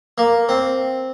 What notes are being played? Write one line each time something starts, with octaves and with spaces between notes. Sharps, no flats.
A#3
C4